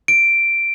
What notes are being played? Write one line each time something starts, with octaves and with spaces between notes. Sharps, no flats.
D7